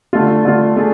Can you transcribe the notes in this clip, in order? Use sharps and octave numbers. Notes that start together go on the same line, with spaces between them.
D3 A3 D4 F4
D3 A3 D4 F4
A3 D4 G#4